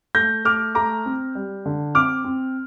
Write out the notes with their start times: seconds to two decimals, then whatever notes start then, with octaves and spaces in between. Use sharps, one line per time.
0.15 A3 G6 A#6
0.45 A3 D6 F6
0.75 A3 A#5 D6
1.06 C4
1.35 G3
1.66 D3
1.95 C4 D6 F6
2.24 C4